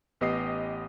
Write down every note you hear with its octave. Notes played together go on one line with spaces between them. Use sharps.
A1 B3 G4 D#5 D#6 C7